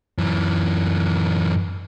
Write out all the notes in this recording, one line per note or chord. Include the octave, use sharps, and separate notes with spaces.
F#2 E3